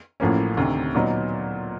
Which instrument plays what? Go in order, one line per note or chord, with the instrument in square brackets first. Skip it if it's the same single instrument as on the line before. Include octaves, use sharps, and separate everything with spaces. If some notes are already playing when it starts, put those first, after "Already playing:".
[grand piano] A1 A2 F3 A#3 C#4
D2 C3 D#3
A#2 F#3 B3 D#4